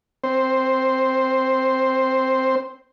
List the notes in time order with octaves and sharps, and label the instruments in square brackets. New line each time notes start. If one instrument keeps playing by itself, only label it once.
[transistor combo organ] C4 C5